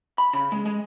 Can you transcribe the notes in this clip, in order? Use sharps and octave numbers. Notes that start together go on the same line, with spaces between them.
B5
C#3
G#3
G#3